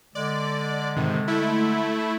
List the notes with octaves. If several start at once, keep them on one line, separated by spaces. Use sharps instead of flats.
D3 G#3 D5
G#2 C3 D#3
A3 E4